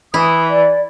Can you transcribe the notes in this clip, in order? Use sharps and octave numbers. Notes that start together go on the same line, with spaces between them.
E3 E4 D#6
D5